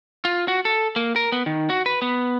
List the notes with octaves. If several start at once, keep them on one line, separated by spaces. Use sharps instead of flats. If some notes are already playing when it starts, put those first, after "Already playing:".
F4
F#4
A4
A#3
A#4
B3
D#3
F#4
B4
B3